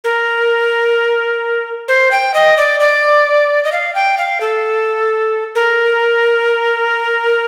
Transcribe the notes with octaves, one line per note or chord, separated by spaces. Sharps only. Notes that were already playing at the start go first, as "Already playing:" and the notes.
A#4
C5
G5
D#5
D5
D5
D#5
F5
G5
F5
A4
A#4